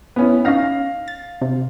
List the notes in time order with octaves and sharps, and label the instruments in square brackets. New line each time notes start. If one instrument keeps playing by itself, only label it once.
[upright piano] B3 C#4 E4
[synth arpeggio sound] C#4 D#4 [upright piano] F5 A#6
[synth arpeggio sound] A6
C3